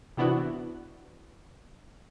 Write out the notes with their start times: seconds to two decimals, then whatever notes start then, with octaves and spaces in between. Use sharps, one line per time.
0.17 C3 E3 B3 D4 E4 F#4